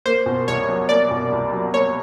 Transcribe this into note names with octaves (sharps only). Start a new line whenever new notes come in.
A#3 C5
B2
C2 C#5
F#3
A#3 D5
B2
C2
F#3
A#3 C#5